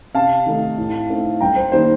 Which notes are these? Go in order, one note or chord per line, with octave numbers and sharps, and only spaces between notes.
C3 F5 A5
D#3 A3 D#4
A2
A3 C4 D#4
G2 G5 A#5
C5
D#3 G3 A#3 D#4 C5